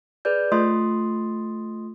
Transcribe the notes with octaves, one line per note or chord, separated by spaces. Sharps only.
G#4 B4 D5 G6
A3 F4 D#5 C6 D#6